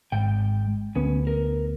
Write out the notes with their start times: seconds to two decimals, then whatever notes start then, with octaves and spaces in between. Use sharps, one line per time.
0.12 G#1 G#3 G5
0.95 D2 B3 C#4
1.27 A#4